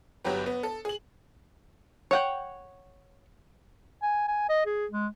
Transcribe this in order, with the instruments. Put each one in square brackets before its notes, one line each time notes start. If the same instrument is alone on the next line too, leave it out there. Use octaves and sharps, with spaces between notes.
[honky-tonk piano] G1 F#3 B3 G4 B4
B3
A4
G#4 F#7
[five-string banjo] C#5 F#5 G5
[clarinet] G#5
G#5
D#5
G#4
G#3